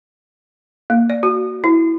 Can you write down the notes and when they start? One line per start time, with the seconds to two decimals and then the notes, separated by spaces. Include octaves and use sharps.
0.90 A#3
1.10 D5
1.23 F#4
1.64 E4